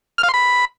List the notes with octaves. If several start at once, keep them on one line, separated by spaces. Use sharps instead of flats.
F6
F5
C6
B5